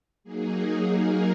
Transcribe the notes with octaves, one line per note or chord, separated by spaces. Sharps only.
F#3 A#3 D#4 G#4
A#4